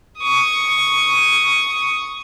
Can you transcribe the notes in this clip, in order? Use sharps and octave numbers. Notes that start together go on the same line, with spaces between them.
C#6 D#6